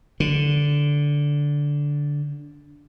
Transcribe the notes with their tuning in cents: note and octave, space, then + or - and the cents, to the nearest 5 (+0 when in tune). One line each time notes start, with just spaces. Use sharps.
D3 -10